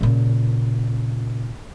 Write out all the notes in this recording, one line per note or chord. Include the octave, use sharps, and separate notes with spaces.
A#2 C#3